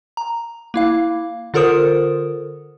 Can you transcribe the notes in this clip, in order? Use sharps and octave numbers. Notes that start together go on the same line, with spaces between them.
A#5
A#3 E4 F5
D3 F4 A4 A#4 C5 D#6